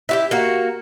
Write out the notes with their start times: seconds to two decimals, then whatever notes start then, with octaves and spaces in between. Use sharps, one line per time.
0.09 E4 F#4 G4
0.31 A#3 F#4